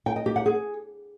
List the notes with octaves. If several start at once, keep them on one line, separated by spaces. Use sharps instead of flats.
G5
D#5
G4
F#5
G#4